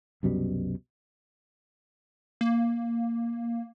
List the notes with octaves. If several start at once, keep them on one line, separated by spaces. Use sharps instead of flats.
C2 F#2 B2 G3
A#3